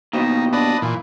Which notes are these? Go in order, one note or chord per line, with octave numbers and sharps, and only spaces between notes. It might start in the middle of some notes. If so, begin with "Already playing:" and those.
D#2 B2 D#4
D4 B4 D#5
A#2 E3